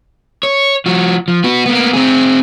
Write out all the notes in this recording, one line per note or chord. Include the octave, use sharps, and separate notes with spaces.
C#5
F3 F#4
F3
B3 F#4
A#3 B3
C4 G#4